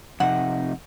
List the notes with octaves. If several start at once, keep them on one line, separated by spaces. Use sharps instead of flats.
F2 C3 D#4 F#5